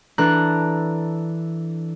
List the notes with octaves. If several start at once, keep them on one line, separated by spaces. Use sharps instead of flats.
E3 D4 A4 A#5 F#6